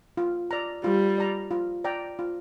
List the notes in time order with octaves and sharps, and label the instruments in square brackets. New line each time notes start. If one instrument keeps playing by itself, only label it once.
[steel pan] F4
D5 A#5
[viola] G3 [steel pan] F4
[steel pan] D5 A#5
F4
D5 G5 A#5
F4